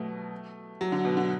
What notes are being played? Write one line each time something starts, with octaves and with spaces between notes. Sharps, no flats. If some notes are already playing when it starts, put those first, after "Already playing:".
Already playing: B2 F#3 A3
F#3
D3
B2
D3